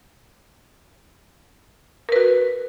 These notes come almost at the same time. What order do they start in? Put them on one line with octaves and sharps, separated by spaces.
A#4 B4 F#4